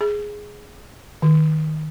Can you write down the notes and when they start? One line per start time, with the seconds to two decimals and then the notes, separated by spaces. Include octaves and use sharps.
0.01 G#4
1.22 D#3